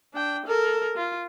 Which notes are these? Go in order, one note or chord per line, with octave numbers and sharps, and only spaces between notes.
D4 G5
A4 A#4
F4